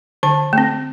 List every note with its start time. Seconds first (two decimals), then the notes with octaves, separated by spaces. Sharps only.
0.23 D3 A5
0.53 A3 C4